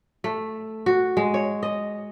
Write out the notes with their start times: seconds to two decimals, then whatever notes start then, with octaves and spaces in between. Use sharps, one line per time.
0.24 A3
0.86 F#4
1.17 G#3
1.34 C#5
1.63 D#5